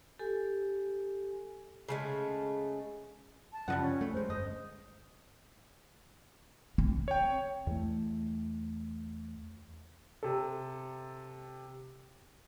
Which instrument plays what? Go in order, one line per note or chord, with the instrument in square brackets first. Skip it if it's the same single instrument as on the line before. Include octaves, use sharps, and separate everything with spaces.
[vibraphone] G4 A4 G#5
[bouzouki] C#3 G#3 A3
[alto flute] A5
[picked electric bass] F#2 C#3 F3 [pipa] G3 D#4 F#5
[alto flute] C#4
[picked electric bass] A3
[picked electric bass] F2 G#3 [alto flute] C5
[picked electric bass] G1 [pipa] D#5
[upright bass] C4
[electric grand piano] C#5 G5
[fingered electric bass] E2 A3
[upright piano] C3 A4